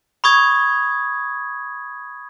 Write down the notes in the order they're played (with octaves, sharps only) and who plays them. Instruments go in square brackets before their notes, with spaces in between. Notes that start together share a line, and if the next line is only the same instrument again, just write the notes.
[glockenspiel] B5 C#6 D#6 G#6